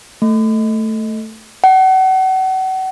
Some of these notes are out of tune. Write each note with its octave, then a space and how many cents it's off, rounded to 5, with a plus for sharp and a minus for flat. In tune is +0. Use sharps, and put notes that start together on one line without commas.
A3 +5
F#5 +35